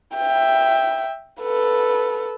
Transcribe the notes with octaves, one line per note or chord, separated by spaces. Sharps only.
E5 G5
A4 B4